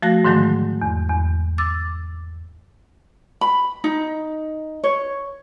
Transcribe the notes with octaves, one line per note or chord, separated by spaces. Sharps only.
F3 A3 F#4 F#6 A#6
G#2 D3 D#3 F#3 G#3 A3
E2
E2
D6 E6 A6
B5
D#4
C#5